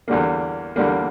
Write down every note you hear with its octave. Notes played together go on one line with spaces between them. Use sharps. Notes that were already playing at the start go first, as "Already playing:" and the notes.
E2 D3 G3 A#3
E2 D3 G3 A#3